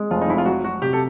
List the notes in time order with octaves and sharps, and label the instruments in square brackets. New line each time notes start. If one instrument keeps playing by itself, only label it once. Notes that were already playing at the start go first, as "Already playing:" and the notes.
Already playing: [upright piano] G#3
[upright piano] F1 [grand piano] F4
[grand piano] D#4
[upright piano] F2 [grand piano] E4
[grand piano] F4
[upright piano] F#3 [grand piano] F#4
[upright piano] F#3 [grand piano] F#4
[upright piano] C3 [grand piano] G4
[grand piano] A4